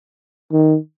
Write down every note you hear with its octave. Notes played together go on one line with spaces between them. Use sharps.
D#3